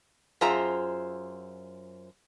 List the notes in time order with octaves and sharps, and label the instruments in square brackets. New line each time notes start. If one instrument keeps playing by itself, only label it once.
[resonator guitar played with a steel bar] F#2 F4 G#4 C5 E5 A#5